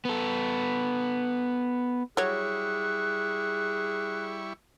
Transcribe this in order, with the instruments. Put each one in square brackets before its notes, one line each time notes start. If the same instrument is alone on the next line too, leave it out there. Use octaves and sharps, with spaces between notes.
[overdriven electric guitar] B3 A4
[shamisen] F#3 C#5 [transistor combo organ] G3 E4 C#6 [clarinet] G#4 [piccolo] F#6